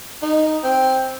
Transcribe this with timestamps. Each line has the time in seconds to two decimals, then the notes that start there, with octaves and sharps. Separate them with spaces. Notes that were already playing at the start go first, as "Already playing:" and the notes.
0.22 D#4
0.64 C4